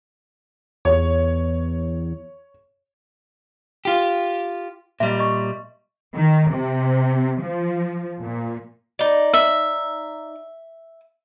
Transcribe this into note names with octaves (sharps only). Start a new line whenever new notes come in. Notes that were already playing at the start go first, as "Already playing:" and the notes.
E2 C#5
F4 G4
A#2 G3 D#5 E5
D#5 C#6
D#3
C3
F3
A#2
D#4 D5
E5